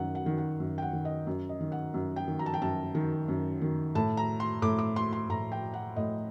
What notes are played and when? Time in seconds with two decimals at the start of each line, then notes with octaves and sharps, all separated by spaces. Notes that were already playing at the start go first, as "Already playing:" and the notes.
Already playing: F#2 D#3 F#5
0.15 F#5
0.26 D#3
0.38 F#5
0.60 F#2
0.78 G5
0.82 F#5
0.93 D#3
1.05 D#5
1.27 F#2
1.49 D#5
1.60 D#3
1.72 F#5
1.94 F#2
2.16 G5
2.28 D#3
2.39 A#5
2.46 A5
2.54 G5
2.61 F#2 A5
2.95 D#3
3.28 F#2
3.62 D#3
3.95 A2 A5
4.17 A#5
4.40 C6
4.62 A2 D6
4.79 D6
4.96 C6
5.13 C6
5.29 A2 A#5
5.52 G5
5.74 F#5
5.96 A2 D#5